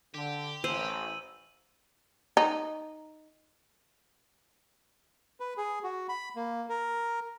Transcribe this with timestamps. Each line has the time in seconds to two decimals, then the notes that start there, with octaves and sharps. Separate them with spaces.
0.14 D3 G4
0.64 A1 C5 E6 D#7 F#7
2.37 D#4
5.40 B4
5.57 G#4
5.84 F#4
6.09 B5
6.36 A#3
6.69 A#4